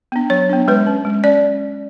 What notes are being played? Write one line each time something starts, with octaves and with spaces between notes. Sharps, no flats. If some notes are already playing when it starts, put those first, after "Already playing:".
B3 D4
F#3 C#5
B3 D4
G#3 B4
C#4
G#3
C#4 D5